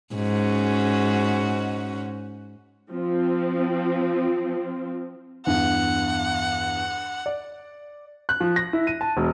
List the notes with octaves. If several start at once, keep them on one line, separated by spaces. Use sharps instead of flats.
G#2 C#4 F#4
F3 C4
E2 G2 F#5
D5
F#6
F3
A#6
E4
D#7
A5
E1